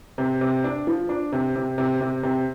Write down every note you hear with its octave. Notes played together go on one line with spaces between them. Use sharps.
C3
C3
D4
F3
D4
C3
C3
C3
C3
C3